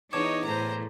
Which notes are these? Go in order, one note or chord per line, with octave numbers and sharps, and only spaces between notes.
E2 D#4 C#5 A5 D6 G#6
A2 C5 A#5